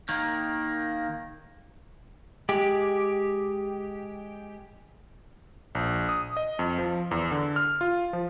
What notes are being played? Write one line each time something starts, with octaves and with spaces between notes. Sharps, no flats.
D#3 A#3
G#3 G4
A#1
D#6
D#5
F2
F3
E2
D3
F6
F4
F3